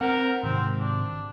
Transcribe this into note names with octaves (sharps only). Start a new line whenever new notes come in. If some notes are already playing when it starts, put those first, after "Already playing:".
C4 A#4 C5 F#5
G#2 C3 D#3 C4
D4